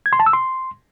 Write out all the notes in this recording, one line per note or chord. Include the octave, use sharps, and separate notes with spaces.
G#6
C6
A5
E6
C6